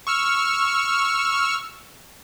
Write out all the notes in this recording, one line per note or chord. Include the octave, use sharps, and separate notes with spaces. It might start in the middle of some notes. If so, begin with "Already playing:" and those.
C#6 E6 F6